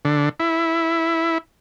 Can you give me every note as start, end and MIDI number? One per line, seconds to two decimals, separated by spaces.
0.05 0.29 50
0.40 1.38 64